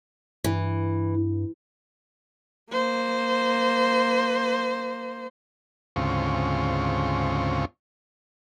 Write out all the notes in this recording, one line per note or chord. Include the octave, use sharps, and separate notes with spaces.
G2 E3
A#3 C5
D2 G#2 C#3 C4 F4 C#6